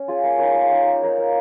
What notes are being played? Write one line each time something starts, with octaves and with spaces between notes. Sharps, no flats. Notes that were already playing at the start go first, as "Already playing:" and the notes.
Already playing: C#4
F4 G#4 C#5
A#3
D#4 A#4 C#5
A#3
D#4 A#4 C#5
A#3
D#4 A#4 C#5
A#3